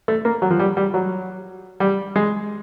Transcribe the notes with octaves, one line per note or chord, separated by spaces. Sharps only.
A3
A#3
F#3
F3
G3
G3
F#3
G3
G#3